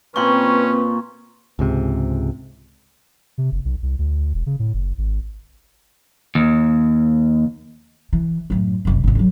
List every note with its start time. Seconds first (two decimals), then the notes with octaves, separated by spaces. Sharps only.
0.16 A#2 C4 C#4 B4 G5 A#5 C6 C#6
1.59 C#2 G#2 C3
3.38 C3
3.52 F#1
3.65 B1
3.83 C2
3.98 D2
4.34 E1
4.46 C#3
4.59 A2
4.74 F#1
4.98 G#1
6.35 D#2
8.13 E3
8.50 F#2 A2
8.85 F#1 C2
9.04 G#1 C#2
9.15 D3 F#3